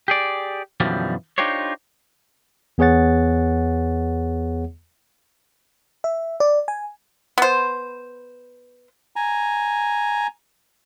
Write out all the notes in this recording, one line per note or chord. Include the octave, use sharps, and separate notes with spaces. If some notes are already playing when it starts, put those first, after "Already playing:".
G4 G#4 D5
F#2 B2 D3 E3 F3 G3
D4 D#4 F4 G4 C5 C#5
E2 B3 G#4 C#5 F#5 A6
E5
D5
G#5
B3 C5
G#5 A#5